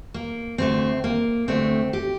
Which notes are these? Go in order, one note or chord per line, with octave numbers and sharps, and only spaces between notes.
A#3
D2 D3 A3 C4
A#3
D2 D3 A3 C4
G4